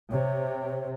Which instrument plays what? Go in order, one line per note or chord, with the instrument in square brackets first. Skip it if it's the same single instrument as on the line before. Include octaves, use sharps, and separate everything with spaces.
[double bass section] C3 [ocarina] C#5